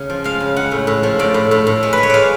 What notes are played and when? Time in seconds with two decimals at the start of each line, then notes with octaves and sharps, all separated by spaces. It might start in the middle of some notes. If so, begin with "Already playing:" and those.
Already playing: C#3
0.10 F3
0.24 G#3 F5
0.40 C#3
0.56 G#3 F#5
0.71 A2
0.87 A2
1.03 F3
1.19 A2 D5
1.34 A2
1.51 A2
1.67 A2
1.83 G#3
1.93 G#3 B4
2.03 C#5
2.10 G#3 D5 F5